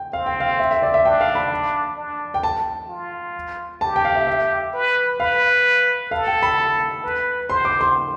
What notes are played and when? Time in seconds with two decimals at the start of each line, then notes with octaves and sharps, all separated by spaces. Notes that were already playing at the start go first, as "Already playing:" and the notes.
Already playing: G5
0.13 C4 F5
0.26 G5
0.40 F5
0.59 E5
0.71 E5
0.83 D5
0.94 E5
1.05 D4 G5
1.21 F5
1.35 B5
1.97 D4
2.34 G5
2.43 A5
2.89 F4
3.81 G4 A5
3.96 G5
4.05 F5
4.15 E5
4.27 E5
4.73 B4
5.20 B4 F5
6.11 A4 F5
6.27 G5
6.42 B5
7.04 B4
7.49 C5 C6
7.65 D6
7.81 C6